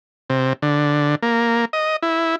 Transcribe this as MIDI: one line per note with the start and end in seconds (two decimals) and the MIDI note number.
0.30 0.53 48
0.62 1.15 50
1.22 1.65 58
1.73 1.96 75
2.02 2.36 64